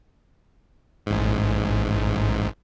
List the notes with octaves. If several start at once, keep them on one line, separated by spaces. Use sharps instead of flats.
A1 G#2